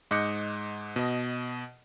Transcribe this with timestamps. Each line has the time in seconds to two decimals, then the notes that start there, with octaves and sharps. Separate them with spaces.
0.11 G#2 D#5 D6 F#6 G6 C#7
0.96 B2 D#5